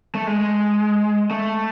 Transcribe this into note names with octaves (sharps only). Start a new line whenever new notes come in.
A3
G#3
A3